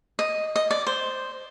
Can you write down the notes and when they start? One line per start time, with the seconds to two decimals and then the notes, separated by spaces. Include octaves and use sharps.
0.19 D#5
0.56 D#5
0.71 D5
0.87 C5